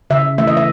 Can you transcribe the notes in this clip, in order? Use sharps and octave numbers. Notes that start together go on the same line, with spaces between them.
C#3 E5
E3 A3 E5
D#5
E5